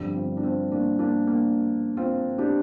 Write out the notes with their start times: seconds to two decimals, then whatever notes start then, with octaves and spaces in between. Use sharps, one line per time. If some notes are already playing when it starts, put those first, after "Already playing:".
Already playing: G2 D3 F3 G3 C4
0.15 C4 F4
0.37 D4
0.43 C4 F4
0.72 A#3 D4
0.99 A#3 D4
1.27 A#3
1.97 C4 F4
2.38 D4 G4